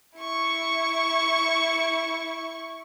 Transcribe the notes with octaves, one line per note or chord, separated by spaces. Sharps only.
E4 C#6